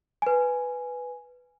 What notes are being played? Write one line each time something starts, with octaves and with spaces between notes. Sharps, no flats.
B4 G#5